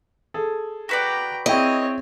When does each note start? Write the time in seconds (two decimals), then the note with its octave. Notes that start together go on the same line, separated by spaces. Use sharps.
0.34 G#4 A4
0.89 F#4 B4 D5 G5 A#5
1.46 C4 E4 G#4 C#5 D#5 G5